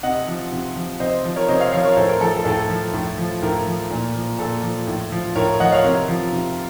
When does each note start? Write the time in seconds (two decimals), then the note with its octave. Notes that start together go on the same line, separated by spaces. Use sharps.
0.03 C3 D#5 F#5
0.27 F3
0.52 C3
0.76 F3
1.00 C3 C5 D#5
1.24 F3
1.36 A#4 C#5
1.48 C3 C5 D#5
1.60 C#5 F5
1.73 F3 C#5 F5
1.84 A#4 C#5
1.97 A2 A4 C5
2.09 A#4
2.21 F3 A4
2.33 A4
2.45 A2 A4
2.69 F3
2.93 A2
3.18 F3
3.42 A2 A#4
3.66 F3
3.90 A#2
4.15 F3
4.39 A#2 A4
4.63 F3
4.87 A2
5.12 F3
5.35 A2 A#4 C#5
5.60 F3 D#5 F#5
5.72 C#5 F5
5.84 C3 A#4
6.08 F3
6.32 C3